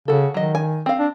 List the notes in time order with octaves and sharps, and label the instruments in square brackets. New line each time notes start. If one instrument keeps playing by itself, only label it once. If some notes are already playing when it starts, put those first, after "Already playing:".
[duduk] C#3 [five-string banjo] F#4 A4
[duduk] D#3 [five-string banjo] F#3 D#5
[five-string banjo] G#5
C4 F5
[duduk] D4